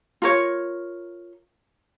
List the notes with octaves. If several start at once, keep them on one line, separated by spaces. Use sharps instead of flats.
F4 A#4 C#5